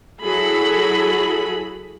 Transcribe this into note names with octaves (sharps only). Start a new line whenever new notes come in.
F#3 E4 F#4 G#4 A4 B5